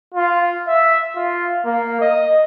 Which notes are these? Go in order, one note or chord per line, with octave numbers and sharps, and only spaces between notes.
F4
E5
F4
A#3
D#5